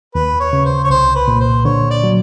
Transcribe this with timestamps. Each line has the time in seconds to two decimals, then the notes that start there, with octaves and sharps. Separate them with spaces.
0.15 D#2 B4
0.40 C#5
0.53 C#3
0.65 C5
0.84 C#5
0.90 C2 C5
1.15 B4
1.28 A#2
1.40 C5
1.65 D3 C#5
1.90 D5
2.04 F#3